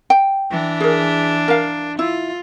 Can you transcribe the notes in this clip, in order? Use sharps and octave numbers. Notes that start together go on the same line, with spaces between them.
G5
E3 D4
G#4 A#4
A#4 F5
E4 F4